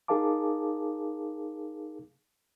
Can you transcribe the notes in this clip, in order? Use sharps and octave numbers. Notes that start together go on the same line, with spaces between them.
D#4 G#4 A#4 F5 A5 D6